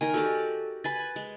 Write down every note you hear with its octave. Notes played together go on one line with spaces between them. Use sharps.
D#3 A#4 G#5 A#5
F#4 G4 A4 D5
B4 G#5 B5 A6
G#3